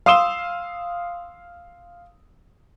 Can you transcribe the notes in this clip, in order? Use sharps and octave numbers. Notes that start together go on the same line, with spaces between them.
F5 C6 D#6 E6 E7 G7